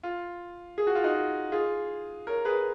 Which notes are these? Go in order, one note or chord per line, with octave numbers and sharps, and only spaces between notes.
F4
G#4
F#4
F4
D#4 F#4
F4 G#4
A#4 C#5
G#4 B4